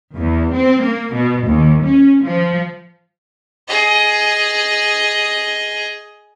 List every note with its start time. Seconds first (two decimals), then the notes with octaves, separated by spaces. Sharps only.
0.16 E2
0.53 C4
0.82 A#3
1.14 B2
1.47 D#2
1.85 C#4
2.22 F3
3.68 G#4 D#5